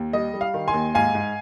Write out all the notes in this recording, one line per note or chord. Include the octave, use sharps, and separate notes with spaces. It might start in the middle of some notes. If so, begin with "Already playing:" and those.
Already playing: D#2
G3 D#5
G3
F5
D#3
G#5 C6
D#2
G#2 F5 G#5
G#2